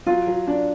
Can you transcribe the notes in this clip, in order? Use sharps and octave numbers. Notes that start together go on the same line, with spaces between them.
F#3 F4
F#3
D4